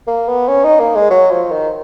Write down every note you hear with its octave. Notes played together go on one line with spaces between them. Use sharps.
A#3
B3
C#4
D#4
A#3
G#3
F#3
F3
D#3